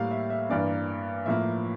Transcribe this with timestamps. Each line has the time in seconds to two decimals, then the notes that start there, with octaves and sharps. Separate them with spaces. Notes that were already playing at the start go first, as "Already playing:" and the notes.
Already playing: A2 G3 A#3 F5
0.11 E5
0.30 E5
0.50 G2 E3 A#3 D5
1.26 A2 F3 A#3 E5